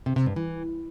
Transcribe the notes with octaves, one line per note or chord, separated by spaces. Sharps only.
C3
C3
G2
E3